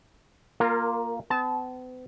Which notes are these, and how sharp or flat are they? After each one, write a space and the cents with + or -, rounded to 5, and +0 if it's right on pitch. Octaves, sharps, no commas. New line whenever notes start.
A#3 +5 F4 +0 A#4 -25
B3 +45 A5 -20